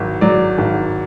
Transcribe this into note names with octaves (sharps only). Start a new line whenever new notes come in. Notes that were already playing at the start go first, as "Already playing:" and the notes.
Already playing: G#1 F#3
F#3 D5
G#1